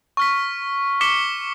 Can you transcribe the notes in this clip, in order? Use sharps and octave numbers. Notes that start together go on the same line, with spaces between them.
C#6 F6 B6
D6 B6 C#7 E7 G7